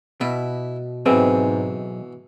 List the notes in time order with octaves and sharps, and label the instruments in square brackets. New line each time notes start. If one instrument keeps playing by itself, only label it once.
[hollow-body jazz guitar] B2 [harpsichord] E4
[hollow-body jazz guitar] B1 C4 G#4 [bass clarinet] G#2 [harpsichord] B2 E3